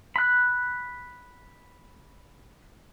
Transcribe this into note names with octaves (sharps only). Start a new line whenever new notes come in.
B5 F#6